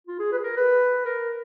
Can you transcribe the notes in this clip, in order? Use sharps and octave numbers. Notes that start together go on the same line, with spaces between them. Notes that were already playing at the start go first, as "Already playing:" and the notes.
F4
G#4
B4
G#4
A#4
B4
A#4